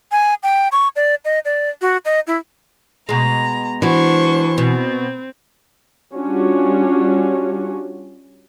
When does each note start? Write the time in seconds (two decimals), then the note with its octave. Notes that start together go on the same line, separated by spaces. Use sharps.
0.12 G#5
0.43 G5
0.72 C#6
0.96 D5
1.25 D#5
1.45 D5
1.82 F#4
2.05 D#5
2.27 E4
3.09 B2 G#3 A#5
3.82 E3 D4 F#4 C5 C#6
4.58 B2 C4
6.15 G3 C#4 D4 F4 F#4